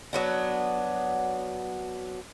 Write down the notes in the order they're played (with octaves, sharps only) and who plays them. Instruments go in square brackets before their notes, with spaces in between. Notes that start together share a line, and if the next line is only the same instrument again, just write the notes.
[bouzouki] F#3 B3 D4